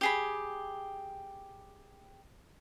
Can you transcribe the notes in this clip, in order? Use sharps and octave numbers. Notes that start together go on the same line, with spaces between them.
G4 G#4 B5